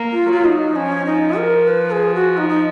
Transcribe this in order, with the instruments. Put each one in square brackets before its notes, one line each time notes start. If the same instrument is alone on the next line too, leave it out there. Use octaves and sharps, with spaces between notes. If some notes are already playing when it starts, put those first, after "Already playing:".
Already playing: [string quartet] A#3
[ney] F4
[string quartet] F#3 [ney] F4
[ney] D#4
[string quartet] F3 [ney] C#4
[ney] D#4
A#4
B4
G#4
F#4
D#4
D#4